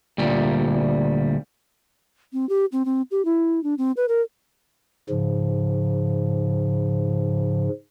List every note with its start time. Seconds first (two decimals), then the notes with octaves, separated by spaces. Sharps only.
0.18 D2 A#2 G3
2.33 C4
2.49 G4
2.72 C4
2.85 C4
3.11 G4
3.25 E4
3.63 D4
3.78 C4
3.97 B4
4.08 A#4
5.10 G#2 C#3 F3